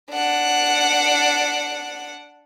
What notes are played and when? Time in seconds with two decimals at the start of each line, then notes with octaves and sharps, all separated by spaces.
0.11 D4 F#5